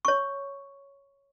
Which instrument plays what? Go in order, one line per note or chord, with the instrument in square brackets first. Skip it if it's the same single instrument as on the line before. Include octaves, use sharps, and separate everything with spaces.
[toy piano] C#5 C#6